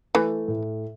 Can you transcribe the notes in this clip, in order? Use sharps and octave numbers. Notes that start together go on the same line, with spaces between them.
E3 A3
A2